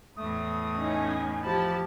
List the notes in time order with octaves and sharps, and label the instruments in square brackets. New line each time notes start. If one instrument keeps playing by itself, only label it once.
[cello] E2 A2 [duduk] A3 [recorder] D#6
[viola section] C#4 D#4 G#5
[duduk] F3 [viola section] E4 G4 A5 [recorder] B5